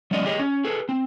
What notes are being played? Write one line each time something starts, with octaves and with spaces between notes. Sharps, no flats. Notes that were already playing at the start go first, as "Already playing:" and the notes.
F#3 G#3 C#4 D5 D#5
G4 G#4 C#5 D#5
C#4
G#4 A4 B4
C4